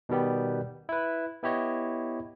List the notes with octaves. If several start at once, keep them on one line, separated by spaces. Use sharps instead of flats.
B2 D#3 G3 B3 G4
E4 B4
B3 E4 G4 C#5 D#5